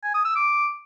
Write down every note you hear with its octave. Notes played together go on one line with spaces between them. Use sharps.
G#5
D#6
E6
D6